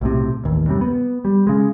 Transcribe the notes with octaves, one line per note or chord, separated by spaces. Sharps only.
B1 A2 C3
A1 D#2
F#2 C3 G3
B3
G3
C#3 G#3